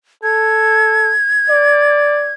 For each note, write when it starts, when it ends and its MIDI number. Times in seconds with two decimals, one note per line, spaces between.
0.23 1.13 69
0.23 2.34 92
1.50 2.33 74